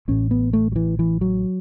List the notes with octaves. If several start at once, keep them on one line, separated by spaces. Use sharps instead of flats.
A1 A2 C#4
B3
A3
F#3
E3
E3
F#3